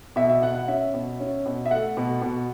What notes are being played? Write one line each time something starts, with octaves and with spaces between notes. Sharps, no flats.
B2 E5
E5
B2 F#5
F#5
C#4 E5
B2
C#4
B2
E5
A3 F#5
B2
B2